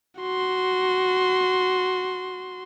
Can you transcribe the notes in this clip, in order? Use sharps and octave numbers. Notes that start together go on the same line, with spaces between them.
F#4 C6